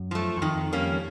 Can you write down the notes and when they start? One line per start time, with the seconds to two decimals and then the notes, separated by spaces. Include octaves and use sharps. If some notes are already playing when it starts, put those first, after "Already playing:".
Already playing: F#2
0.11 F3 A3
0.37 F#2
0.41 F2 D#3
0.73 G3 A#3 C#4